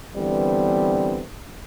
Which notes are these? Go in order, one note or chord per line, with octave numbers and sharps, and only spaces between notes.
D3 E3 G3 B3 C4